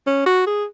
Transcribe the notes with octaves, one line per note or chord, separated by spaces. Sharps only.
C#4
F#4
G#4